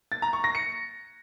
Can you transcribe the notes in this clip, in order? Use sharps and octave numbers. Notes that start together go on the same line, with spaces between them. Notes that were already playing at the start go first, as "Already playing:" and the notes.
A6
A#5
C#6
A#6
C#7